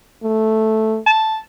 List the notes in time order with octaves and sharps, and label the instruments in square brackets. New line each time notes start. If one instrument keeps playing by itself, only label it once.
[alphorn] A3
[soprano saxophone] A5